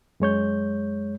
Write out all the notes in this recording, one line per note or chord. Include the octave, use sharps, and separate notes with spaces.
F#2 G#3 C#5 G6